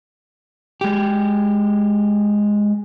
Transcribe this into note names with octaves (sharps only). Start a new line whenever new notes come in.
G#3 G4